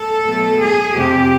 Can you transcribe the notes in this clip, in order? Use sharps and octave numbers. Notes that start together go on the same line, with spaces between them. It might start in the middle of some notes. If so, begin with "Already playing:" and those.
Already playing: A4
B2 F#3 A3
G#4
F2 C3 F3 G4